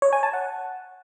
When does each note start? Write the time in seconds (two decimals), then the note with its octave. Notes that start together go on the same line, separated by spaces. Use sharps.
0.02 C#5
0.13 G#5
0.23 A5
0.33 F#5